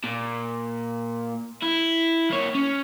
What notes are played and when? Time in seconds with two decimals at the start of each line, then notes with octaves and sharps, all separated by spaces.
0.04 A#2
1.62 E4
2.30 A#3 C#5
2.55 C#4